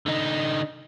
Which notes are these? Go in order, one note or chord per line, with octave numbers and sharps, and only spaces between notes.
D3 D#4